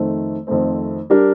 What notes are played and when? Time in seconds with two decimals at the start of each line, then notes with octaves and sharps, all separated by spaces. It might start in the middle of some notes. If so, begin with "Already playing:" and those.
Already playing: F2 D#3 A3 C4
0.47 F2 D#3 A3 C4
1.10 G3 D4 G4 A#4